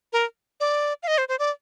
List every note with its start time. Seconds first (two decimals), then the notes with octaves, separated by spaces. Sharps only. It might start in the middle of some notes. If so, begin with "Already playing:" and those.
0.13 A#4
0.60 D5
1.03 F5
1.08 D#5
1.18 C5
1.29 C5
1.39 D5